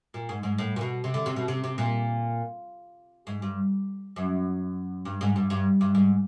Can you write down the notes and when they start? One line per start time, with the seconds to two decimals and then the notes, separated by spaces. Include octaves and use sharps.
0.14 A#2
0.29 G#2
0.43 G#2
0.58 A2
0.76 A#2
0.81 B2
1.04 C3
1.14 D3
1.26 C3
1.36 B2
1.48 C3
1.64 C3
1.78 A#2
3.27 G#2
3.42 G2
4.16 F#2
5.05 G2
5.21 G#2
5.36 G2
5.50 G2
5.81 G2
5.95 G#2